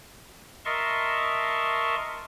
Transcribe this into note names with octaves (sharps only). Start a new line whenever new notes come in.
A#4 D#5 E5 A5 C6 C#6